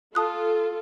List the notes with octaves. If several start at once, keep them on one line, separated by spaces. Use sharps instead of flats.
F4 A4 A5 D#6 F#6